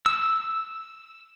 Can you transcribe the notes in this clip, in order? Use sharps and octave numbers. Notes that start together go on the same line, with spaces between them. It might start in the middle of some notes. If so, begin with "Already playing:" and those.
E6